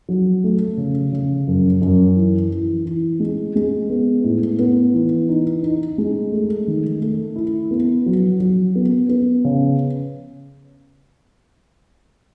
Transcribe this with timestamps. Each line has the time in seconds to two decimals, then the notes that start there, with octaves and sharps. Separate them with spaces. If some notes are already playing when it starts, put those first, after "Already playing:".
0.09 F#3
0.44 A3
0.77 C#3
1.12 C#3
1.47 F#2
1.82 F#2
2.16 E3
2.51 E3
2.85 E3
3.20 G#3
3.56 G#3
3.90 B3
4.24 A2
4.59 B3
4.94 E3
5.29 D#4
5.63 D#4
5.98 G#3
6.32 A3
6.67 D#3
7.01 A3
7.36 E4
7.71 B3
8.06 F#3
8.40 F#3
8.75 B3
9.09 B3
9.44 C#3